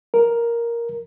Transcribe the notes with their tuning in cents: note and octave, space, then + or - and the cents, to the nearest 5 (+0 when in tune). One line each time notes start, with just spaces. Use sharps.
A#4 +5